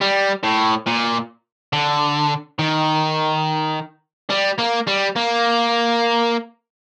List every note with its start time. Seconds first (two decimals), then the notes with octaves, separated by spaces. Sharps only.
0.01 G3
0.44 A2
0.87 A#2
1.73 D3
2.59 D#3
4.30 G3
4.59 A#3
4.88 G3
5.16 A#3